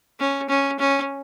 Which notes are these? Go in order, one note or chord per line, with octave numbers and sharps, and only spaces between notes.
C#4
C#4
C#4